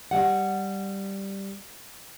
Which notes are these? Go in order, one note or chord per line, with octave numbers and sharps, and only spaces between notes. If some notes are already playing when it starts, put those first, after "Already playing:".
G3 F#5